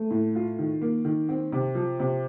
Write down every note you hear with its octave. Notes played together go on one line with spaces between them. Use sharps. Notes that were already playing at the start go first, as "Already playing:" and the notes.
Already playing: A3
A2
F4
D#3
A#3
D#3
C4
C3
F3
C3